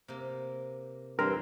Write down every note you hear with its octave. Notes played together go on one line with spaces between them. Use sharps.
C3 A#3
G2 E3 C4 A#4